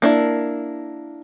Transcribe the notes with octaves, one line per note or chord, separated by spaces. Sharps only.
A#3 D4 E4